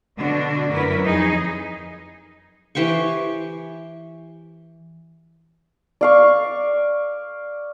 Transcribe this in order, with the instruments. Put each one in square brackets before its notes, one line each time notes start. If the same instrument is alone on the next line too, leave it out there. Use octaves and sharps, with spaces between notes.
[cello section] B2 D3 D4 F#4
F#2 E4 A#4 B4 C#5
F2 D#4 G#4
[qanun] E3 G4 C5 C#6
[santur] D5 F5 C#6